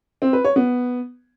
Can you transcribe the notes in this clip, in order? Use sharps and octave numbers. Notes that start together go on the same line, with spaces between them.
C4
B4
C#5
B3